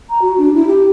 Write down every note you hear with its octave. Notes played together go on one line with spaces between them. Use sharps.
A#5
F#4
D4
E4
G4